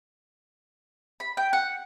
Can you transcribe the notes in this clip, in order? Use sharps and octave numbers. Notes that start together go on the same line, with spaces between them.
B5
G5
F#5